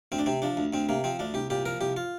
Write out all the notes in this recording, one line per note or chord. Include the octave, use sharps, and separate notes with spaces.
D2 C4
D4
C3 C4
F3 D4
D2
D2 C4
C3 A#3
F3 C4
D2 D4
C2 G4
A#2 G4
F3 A#4
C2 G4
F4